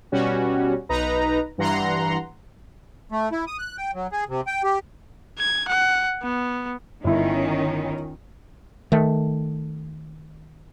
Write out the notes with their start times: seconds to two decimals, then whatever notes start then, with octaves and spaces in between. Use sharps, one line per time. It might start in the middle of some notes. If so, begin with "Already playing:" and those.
0.12 B2 G3 C#4 F#4
0.89 B1 D#4 B4 A#5
1.58 G2 E3 F#5 A#5 C6
3.12 A3
3.32 E4
3.47 D#6
3.59 F#6
3.77 G5
3.94 F#3
4.12 G#4
4.29 C3
4.47 G5
4.63 G4
5.39 G#6
5.68 F#5
6.23 B3
7.04 G1 D#3 C#4 E4
8.92 D#3 A3